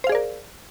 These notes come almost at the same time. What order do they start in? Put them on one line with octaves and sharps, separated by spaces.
C5 F5 G#4 D5 A#4